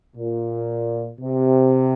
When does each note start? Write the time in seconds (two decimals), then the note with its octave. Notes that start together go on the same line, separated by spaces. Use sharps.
0.16 A#2
1.19 C3